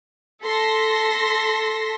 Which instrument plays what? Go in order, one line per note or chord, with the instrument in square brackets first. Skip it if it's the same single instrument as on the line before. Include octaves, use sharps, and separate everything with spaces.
[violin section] A4 C6 A#6 B6